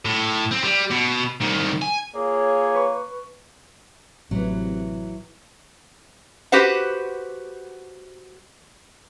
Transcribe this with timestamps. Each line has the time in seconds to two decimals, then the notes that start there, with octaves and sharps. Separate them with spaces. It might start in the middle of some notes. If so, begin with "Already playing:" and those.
0.05 A2
0.51 C4
0.64 G3
0.91 B2
1.40 C2 D#3
1.82 G#5
2.15 A#3 F4 G#4 C#5
2.75 B4 C#6
4.31 A1 C3 E3 F#3
6.52 F#4 G4 B4 C5 F#5